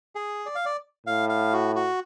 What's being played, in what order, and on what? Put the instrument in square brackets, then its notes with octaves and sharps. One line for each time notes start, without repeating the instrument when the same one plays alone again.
[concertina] G#4
D5
F5
D5
[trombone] A2 [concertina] F5
[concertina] F5
F#4
F#4